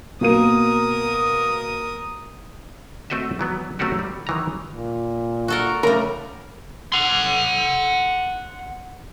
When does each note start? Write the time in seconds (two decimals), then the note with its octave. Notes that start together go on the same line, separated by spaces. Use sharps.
0.21 B2 A#3 A#4 D#6 D#7
3.10 A3 C4 F#4 D#5 E5
3.39 E3 F#3 B3
3.79 F#3 A3 C4 C#4 F#4 G4
3.99 G3
4.27 D#3 E3 A#5
4.71 A#2
5.48 F#4 A4 A#4
5.83 C#3 G3 A3 A#4 A#5
6.92 F#5 C6